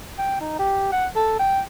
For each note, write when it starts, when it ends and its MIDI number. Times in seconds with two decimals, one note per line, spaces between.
0.19 0.40 79
0.41 0.54 63
0.59 0.89 67
0.92 1.07 78
1.16 1.39 69
1.39 1.61 79